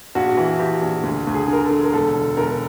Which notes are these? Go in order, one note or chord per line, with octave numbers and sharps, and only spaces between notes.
A#1 F#4
E3
E3 G4
A#1
D2
D2
G#4
D3 A#4
A4
D3
A#4
E1 A4
D3
E1 A#4